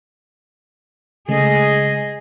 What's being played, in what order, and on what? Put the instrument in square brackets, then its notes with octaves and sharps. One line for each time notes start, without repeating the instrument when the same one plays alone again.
[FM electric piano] C#3 G#3 A3 [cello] G#4 D#5